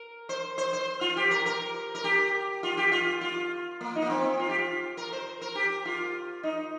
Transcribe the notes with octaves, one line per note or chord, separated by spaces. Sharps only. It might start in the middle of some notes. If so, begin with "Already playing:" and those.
Already playing: A#4
C5
C5
C5
F4
G4
A#4
A#4
A#4
G4
F4
G4
F4
F4
A#3
D#4
A#3
C4
F4
G4
F4
A#4
C5
A#4
G4
F4
D#4